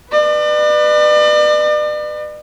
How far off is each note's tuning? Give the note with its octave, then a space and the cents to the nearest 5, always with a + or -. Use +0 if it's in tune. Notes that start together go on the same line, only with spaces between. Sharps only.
B4 +0 D5 +40